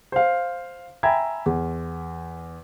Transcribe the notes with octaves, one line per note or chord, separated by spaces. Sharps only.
C5 F5
E5 G5 G#5 A#5 B5 G#6
E2